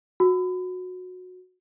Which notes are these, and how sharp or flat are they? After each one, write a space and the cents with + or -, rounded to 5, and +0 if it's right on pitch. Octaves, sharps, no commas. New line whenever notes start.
F#4 -20